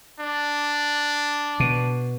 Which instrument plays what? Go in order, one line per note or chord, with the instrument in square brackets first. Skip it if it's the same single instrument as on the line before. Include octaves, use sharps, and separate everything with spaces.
[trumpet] D4
[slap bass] B2